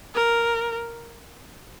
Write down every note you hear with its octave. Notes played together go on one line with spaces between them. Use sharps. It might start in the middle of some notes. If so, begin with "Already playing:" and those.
A#4